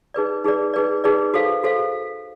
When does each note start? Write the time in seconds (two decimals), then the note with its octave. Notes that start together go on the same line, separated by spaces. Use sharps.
0.14 D#4 G#4 B4 D5
0.44 D#4 G#4 B4 D5
0.74 D#4 G#4 B4 D5
1.04 D#4 G#4 B4 D5
1.34 F#4 A4 C5 F5
1.63 F#4 A4 C5 F5